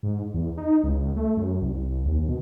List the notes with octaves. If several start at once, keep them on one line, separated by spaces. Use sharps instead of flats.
G#2
E2
D#4
C#2
A3
F#2
C2
D#2
B2